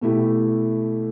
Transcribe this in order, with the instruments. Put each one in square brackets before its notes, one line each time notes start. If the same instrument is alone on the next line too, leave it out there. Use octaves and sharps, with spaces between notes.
[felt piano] B2 A3 E4 G4